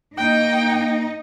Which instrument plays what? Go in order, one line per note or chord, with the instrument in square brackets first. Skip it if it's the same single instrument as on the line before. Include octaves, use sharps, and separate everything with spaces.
[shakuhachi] A#3 [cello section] D#4 [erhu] G5